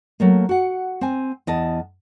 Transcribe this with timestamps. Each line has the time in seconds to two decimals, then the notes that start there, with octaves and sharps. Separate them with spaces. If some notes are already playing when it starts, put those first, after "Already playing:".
0.20 F#3 A3 A#3
0.49 F#4 F#5
1.01 C4 G#5
1.47 E2 D#5 A5